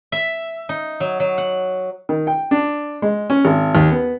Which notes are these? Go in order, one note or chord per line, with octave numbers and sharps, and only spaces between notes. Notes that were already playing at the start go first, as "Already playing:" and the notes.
E5
D#4
F#3
F#3
F#5
D#3
G5
D4
G#3
C#4
G#1
D#2
B3